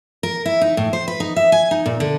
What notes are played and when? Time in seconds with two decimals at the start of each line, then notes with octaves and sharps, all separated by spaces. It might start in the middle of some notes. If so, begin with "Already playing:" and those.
0.23 A#4
0.46 E4
0.61 D#4
0.77 A2
0.93 C5
1.08 B4
1.20 D#4
1.36 E5
1.52 G#5
1.71 D#4
1.86 A#2
2.00 D3